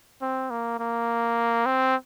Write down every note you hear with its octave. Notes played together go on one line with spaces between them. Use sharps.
C4
A#3
A#3
C4